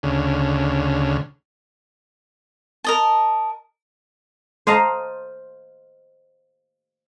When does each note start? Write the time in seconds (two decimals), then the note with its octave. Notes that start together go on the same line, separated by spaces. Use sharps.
0.03 D2 C#3
2.84 A#4 D#5 A5
4.67 C5 D#5 F5 A5 A#5